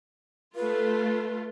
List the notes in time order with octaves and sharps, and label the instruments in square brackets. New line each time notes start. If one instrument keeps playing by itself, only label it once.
[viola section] A3 F4 [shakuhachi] B4